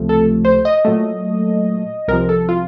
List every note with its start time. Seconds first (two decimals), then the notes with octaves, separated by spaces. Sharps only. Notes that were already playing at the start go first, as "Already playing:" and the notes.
Already playing: C#2 C3 F3 A3
0.09 A4
0.45 C5
0.65 D#5
0.85 A#2 F#3 A3
2.08 C2 C3 F3 A#4
2.29 A4
2.49 F4